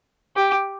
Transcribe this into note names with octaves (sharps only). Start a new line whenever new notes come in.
G4